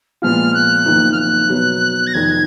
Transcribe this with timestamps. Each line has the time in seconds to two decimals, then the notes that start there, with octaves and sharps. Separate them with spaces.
0.22 A#2 F3 G#3 B3 F4 F6
0.53 F#6
0.85 F#1 F2 D#3 A#3
1.12 F6
1.18 F#6
1.49 B2 F#3 B3
2.06 A#6
2.13 F1 F2 D#3 G#6